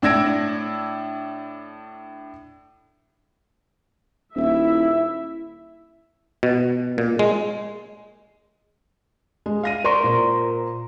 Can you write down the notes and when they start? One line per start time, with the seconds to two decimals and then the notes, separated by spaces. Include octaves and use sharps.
0.02 A2 D4 E6 G#6 A#6 D7
4.36 D#1 E4 E5
6.43 B2
6.98 A#2
7.19 G#3
9.46 G#3
9.63 F5 A#6 D#7
9.84 A#4 C5 D5 C#6
10.04 A#2